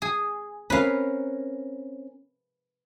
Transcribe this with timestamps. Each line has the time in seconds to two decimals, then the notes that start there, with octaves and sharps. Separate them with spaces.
0.02 G#4
0.70 C4 C#4 A#4 B4 F5